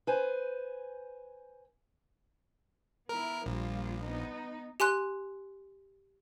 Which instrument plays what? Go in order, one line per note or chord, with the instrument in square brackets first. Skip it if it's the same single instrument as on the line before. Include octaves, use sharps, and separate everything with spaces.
[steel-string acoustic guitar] B4 C5 G#5
[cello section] B3 E4 [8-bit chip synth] A#4
[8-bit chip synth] A#1 [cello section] G3 A#3 F4
[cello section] B3 D#4
[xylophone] G4 G#5 C6 F#6